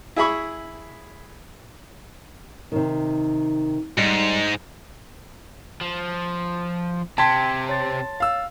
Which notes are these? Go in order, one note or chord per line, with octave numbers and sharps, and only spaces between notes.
E4 G#4 E5 B5 C#6
C3 D#3
G#2 G3
F3
C3 G5 A5 C6 G#6 B6
C#5 A6
F5 E6